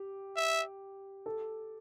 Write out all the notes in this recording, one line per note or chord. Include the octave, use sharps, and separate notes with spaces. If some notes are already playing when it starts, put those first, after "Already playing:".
Already playing: G4
E5
A4